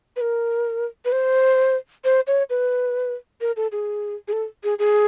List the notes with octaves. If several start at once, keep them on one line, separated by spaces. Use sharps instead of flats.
B4
A#4
B4
C5
C5
C#5
B4
A#4
A4
G#4
G#4
A4
G#4
G#4